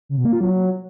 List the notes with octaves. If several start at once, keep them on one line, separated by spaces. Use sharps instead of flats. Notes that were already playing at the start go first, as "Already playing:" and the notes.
C#3
B2
A#3
F4
F#3